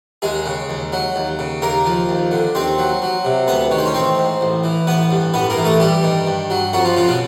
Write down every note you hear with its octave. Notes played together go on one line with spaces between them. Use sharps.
D#2 G#3 G#4
C#3
D#2
F#3
D#2
C#3
D#2 A#3 A#4
F3
D#2
D3
D#2 C4 C5
F#3
F#3
C3
D2 B3 B4
D#3 C#5
C5
C#4 C#5
A1 C4 C5
G#2
A1
E3
A1 B3 B4
G2
A1 B3 B4
A#3 A#4
E3
A3 A4
G2 G3 G4
D#3
G2
F#3
F2 F#3 F#4
F3 F4
C#3 F3 F4
B2 B3